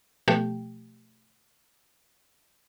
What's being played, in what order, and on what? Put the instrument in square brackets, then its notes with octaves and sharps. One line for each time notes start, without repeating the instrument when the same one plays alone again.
[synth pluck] B2 F3 A3 G4 G5